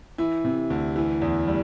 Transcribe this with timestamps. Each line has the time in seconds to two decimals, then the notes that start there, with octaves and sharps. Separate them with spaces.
0.18 E3 E4
0.44 C3
0.70 D2
0.96 E3
1.22 E2
1.48 G3